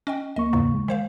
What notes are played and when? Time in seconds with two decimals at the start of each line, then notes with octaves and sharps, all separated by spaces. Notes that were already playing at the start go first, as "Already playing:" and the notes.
0.07 C#4 D#5 G5
0.36 D2 A#3 D#5 C#6
0.53 E2 G#2 C#3
0.74 G#3
0.88 D#3 C5 F5